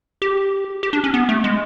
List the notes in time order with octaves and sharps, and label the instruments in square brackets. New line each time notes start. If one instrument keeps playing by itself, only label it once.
[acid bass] G4
G4
D4
C#4
B3
A3
G#3